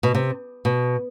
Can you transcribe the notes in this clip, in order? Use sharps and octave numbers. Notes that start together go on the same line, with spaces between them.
B2
C3
B2